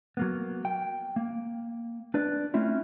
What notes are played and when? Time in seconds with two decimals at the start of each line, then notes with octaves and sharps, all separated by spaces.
0.17 F#3 A#3 B3
0.65 G5
1.16 A#3
2.14 D4 B4 D5
2.54 A3 C4 C#4 E4 F4